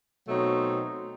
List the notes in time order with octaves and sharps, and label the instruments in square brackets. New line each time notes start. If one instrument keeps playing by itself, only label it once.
[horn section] B2 F#3 A3 C4 D#4